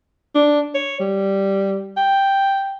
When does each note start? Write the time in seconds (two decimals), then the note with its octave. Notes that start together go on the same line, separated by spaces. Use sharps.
0.35 D4
0.75 C#5
1.00 G3
1.97 G5